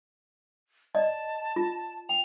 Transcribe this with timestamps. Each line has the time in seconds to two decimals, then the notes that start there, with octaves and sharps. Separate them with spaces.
0.95 D5 D#5 A5
1.56 F4
2.09 G5 F7